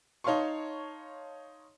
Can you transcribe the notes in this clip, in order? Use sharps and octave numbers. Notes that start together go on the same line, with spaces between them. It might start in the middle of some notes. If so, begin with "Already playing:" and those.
D#4 C#5 F5 A5 C6 C#6